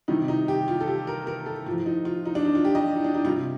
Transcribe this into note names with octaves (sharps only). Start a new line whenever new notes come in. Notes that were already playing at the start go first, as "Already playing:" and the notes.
C3 D#3 G3 D#4
D#4
G4
F4
A4
G4
A#4
A#4
A4
A2 F4
F3
D#4
F4
D#4
D4
D#4
F4
G4
D#5
D#4
D4
D#4
C3 G3 F4